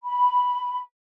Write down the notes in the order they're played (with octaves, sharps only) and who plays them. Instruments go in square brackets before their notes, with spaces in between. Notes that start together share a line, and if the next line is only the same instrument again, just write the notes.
[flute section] B5